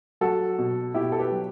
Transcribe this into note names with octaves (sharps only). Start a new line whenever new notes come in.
F#3 F#4 A4
B2
B2 E4 G4
A4
G4 B4
F#3